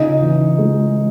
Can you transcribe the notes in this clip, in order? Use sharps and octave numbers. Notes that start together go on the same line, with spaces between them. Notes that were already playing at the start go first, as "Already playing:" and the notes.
Already playing: C#3 D#4 D#5
E3
G#3